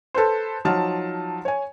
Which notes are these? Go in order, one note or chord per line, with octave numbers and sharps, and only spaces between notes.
A4 B4 C5
F3 F#3 D#4 A5 F6
C#5 G#5